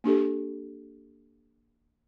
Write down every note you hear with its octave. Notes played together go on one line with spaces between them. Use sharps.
A#3 D4 G4 A4